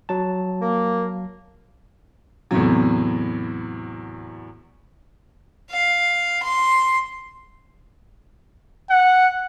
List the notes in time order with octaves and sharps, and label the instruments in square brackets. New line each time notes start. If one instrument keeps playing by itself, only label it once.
[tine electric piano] F#3 A5
[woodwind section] A#3
[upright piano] E2 A2 C3 F#3
[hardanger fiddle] F5
C6
[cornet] F#5